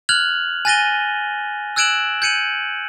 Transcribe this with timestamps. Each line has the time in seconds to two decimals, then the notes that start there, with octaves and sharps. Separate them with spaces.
0.09 F6 F#6 G#6 F7 F#7
0.65 G#5 F#6 A6 A#6 D#7 G7
1.76 E6 F#6 G#6 D7 E7 F#7
2.22 G6 G#6 C#7 D#7 F#7